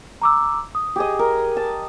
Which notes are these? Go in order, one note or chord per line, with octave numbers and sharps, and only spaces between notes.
A#5 D6 E6
D#6
G4 G#4 D#5
A#4
A5